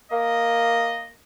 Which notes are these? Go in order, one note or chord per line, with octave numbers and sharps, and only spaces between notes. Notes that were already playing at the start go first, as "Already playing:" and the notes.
A#3 D#5